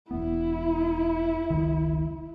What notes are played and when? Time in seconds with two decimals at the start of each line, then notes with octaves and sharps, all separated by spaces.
0.11 E1 B3 E4
1.50 F1 C#2 D#3